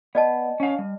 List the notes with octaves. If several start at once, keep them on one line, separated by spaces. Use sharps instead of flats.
B3 D5 D#5 A5
C#4 F5
G3